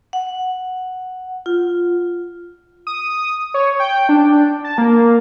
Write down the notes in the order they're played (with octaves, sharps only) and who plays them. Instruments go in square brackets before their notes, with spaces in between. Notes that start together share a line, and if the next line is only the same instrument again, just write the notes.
[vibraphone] F#5
F4
[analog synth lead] D#6
C#5
G5
D4
A5
A#3